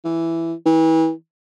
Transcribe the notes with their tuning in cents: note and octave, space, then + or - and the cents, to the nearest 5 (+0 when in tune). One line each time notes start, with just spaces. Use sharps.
E3 +5
E3 -30